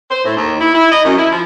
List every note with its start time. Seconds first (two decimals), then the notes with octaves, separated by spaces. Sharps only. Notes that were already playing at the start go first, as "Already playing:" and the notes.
0.11 C5
0.24 A2
0.36 D#2
0.60 E4
0.74 E4
0.91 D#5
1.05 F#2
1.18 E4
1.32 F3